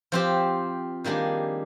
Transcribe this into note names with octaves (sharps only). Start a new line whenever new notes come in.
F3 C4 G4
D#3 G3 A#3 D4 G#4